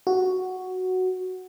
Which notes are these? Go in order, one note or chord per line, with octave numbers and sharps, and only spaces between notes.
F#4